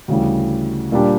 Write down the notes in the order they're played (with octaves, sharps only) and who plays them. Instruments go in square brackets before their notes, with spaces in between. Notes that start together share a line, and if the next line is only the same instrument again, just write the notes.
[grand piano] D2 C#3 E3 G3
A#2 G3 D4 G4